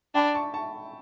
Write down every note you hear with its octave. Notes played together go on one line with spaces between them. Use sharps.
D4 G5 B5
A5 C#6
A5 C#6